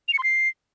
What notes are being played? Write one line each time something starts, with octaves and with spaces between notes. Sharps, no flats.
F7
C#7
C6
C7